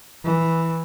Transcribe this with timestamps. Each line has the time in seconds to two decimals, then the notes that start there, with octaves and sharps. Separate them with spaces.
0.24 E3